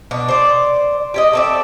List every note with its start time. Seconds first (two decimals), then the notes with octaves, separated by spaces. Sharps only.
0.11 B2 D4
0.28 C5 D5
1.14 G4 C#5 D#5
1.33 A3 C4 D5